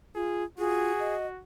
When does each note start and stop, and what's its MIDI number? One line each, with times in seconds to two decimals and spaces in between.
0.15 0.43 65
0.15 0.44 68
0.58 0.92 65
0.58 1.41 66
0.58 1.15 68
1.00 1.27 75